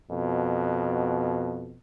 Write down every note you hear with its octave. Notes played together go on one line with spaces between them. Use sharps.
F2 B2